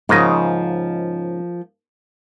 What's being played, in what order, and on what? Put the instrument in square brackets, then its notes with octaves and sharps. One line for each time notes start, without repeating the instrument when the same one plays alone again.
[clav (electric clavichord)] G#2 C#3 D#5 [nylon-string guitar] F3 A#3